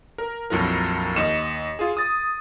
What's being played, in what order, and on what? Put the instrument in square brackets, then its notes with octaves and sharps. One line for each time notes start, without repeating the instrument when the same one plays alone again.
[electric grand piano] A#4
A#1 F2 F#3 E4 A#4
D#2 D#5 C#7 E7
F4 G#4
D#6 A6